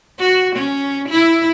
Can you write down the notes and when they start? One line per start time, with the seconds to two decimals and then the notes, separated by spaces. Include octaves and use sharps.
0.19 F#4
0.56 C#4
1.09 E4